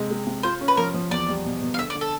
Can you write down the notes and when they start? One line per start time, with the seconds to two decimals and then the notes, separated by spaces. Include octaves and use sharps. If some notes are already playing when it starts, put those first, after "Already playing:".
Already playing: C3 G#3
0.11 G#3
0.27 C3
0.43 F4 C5
0.61 C#4
0.68 B4
0.77 F3 A#4
0.94 F3
1.11 E2 D5
1.29 G3
1.45 B2
1.62 B2
1.74 F5
1.78 D3 E5
1.90 D5
1.95 D3
2.01 A4